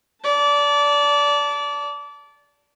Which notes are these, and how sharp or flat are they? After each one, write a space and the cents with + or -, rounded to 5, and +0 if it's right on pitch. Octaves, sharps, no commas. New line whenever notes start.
D5 -25 A5 +0